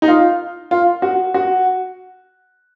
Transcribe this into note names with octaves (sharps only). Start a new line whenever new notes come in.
D#4
F4
F4
F#4
F#4